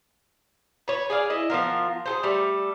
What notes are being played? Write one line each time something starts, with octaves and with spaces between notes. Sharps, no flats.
B4 C#5
G#4 D5 F5
E4 D#5
F3 B3 F4 A#4
G#4 A4 C5
G3 A3